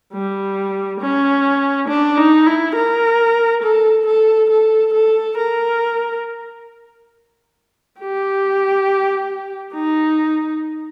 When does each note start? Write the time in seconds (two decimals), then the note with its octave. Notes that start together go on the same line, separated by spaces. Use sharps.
0.14 G3
1.01 C#4
1.88 D4
2.17 D#4
2.46 E4
2.76 A#4
3.63 A4
4.06 A4
4.50 A4
4.94 A4
5.37 A#4
8.00 G4
9.74 D#4